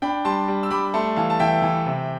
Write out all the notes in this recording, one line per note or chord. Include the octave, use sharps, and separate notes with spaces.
D4 G5 B5
G3 A5 C6
G3
E6
G3 B5 D6
A3 A5 C6
E3 F5 A5
A5
E3 E5 G5
E3
C3